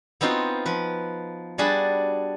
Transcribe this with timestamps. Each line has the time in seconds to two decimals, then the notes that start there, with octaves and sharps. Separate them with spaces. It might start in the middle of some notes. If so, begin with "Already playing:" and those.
0.21 B3 C4 D#4 F4 F#4 C5
0.66 F3 B4
1.58 G3 D4 F#4 G#4 A5 B5